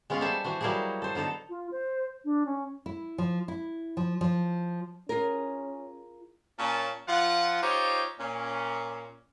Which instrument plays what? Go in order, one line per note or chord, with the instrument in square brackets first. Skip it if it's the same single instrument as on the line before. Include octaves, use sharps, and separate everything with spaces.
[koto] G#3 B3 C#4 F4 G#4 F5
G3 A4 C5 E5 G#5 A5
E3 F#4 C5
F#3 G3 A#3 E4 F#4 G#4
A4 C5
D3 B3 D#4 A4
[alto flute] F4
C5
D4
C#4
[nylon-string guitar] E4
F3
E4
F3
F3
[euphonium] C#4 [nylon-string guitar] F4 G#4 A#4
[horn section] A#2 C#4 A5
F3 F4 F#5
D#4 F4 G4 C5 C#5
A#2 C#4